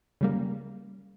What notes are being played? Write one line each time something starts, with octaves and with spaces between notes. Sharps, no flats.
C#3 G3 A#3